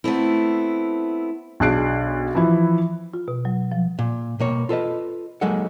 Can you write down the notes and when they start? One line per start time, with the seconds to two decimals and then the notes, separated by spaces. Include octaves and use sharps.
0.04 A3 B3 C4 E4
1.60 B1 D4 G#4 F#6 C7 D7
2.35 E3 F3 E4
3.14 F4
3.28 B2
3.45 F#3
3.72 F3
3.99 A#2
4.40 B2 A#3 C#5
4.69 F4 A4 B4 D#5
5.41 F#3 G#3 A#3 D#4 A4 F#5